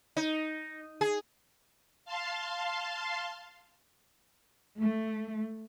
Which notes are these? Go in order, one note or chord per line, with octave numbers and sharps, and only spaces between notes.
D#4
G#4
F5 A5 C6
A3